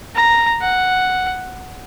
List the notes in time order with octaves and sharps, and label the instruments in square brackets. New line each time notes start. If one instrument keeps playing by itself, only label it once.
[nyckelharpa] A#5
F#5